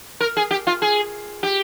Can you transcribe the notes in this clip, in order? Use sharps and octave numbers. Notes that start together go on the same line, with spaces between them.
A#4
G#4
G4
F4
G#4
G4